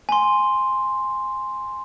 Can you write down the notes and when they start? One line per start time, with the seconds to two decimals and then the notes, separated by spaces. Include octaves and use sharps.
0.09 G#5 C6